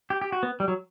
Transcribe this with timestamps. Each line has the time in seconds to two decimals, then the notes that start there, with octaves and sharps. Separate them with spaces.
0.10 G4
0.22 G4
0.32 F#4
0.43 B3
0.60 G3
0.68 F#3